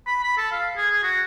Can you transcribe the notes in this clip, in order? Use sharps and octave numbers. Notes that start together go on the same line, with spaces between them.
B5
B5
A4
F5
G#4
G#4
F#4